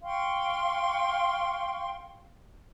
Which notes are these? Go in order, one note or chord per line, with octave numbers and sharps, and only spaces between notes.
F5 G5 C6 C#6